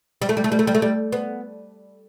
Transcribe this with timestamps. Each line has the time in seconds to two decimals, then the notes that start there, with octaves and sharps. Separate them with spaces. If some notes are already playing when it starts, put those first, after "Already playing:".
0.22 G3
0.29 A3
0.37 G3
0.44 A3
0.52 G3
0.59 A3
0.67 G3
0.75 A3
0.82 G3
1.12 B3